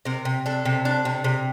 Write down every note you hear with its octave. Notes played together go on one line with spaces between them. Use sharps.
C3 A#4
C3
D4 A4
C3
D4
C3
C3